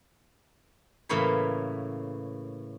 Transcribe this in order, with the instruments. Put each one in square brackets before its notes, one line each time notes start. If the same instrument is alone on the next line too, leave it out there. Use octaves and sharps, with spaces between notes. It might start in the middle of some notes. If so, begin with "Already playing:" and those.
[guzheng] A2 C#3 E3 A#3 C#5 B5